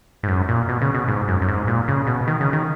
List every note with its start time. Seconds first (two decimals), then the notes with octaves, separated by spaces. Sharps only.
0.23 G#2
0.28 F#2
0.48 A#2
0.69 B2
0.81 C#3
0.95 B2
1.08 G#2
1.28 F#2
1.41 F#2
1.48 G#2
1.67 A#2
1.88 C#3
2.07 B2
2.27 D#3
2.41 C#3
2.53 D#3